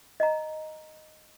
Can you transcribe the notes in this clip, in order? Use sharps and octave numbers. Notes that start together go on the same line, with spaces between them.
D#5 A#5